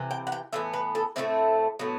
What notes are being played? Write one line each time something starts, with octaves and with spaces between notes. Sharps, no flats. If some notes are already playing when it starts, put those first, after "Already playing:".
Already playing: C3 E3
G5
F#5
G5
A2 E3 B3 E5
B4
A4
A2 E3 A3 C4 E5
A2 F#3 B3